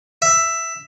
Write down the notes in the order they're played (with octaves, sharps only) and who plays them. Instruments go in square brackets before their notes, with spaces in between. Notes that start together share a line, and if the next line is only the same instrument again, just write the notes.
[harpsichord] E5